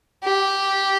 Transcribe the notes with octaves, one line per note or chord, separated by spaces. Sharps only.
G4